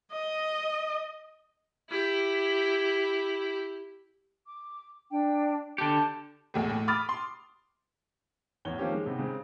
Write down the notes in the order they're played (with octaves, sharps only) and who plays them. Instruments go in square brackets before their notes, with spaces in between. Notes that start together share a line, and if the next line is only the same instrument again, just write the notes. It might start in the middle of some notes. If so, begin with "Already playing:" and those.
[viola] D#5
E4 G4
[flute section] D6
D4 G5
[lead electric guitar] D3 G4 [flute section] A5
[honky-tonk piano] B1 E2 A2
A2
B5 D6 D#6 F6 A6
C6
[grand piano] A1 E2 C#5 G7
D#3 F3 A#3 C4 C#4 G4
G#3
C3 B3 D#4
C#3 G#3 C4